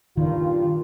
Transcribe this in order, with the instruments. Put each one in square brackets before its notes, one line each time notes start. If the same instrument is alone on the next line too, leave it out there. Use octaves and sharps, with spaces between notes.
[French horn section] G2 A#2 F4 [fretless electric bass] D#3